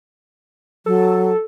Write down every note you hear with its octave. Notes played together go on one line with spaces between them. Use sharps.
F#3 A4